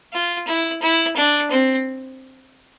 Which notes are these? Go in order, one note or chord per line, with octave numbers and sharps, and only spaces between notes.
F4
E4
E4
D4
C4